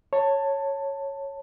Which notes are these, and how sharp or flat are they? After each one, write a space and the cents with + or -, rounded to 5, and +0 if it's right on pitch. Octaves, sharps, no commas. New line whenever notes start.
C#5 -5 A5 +15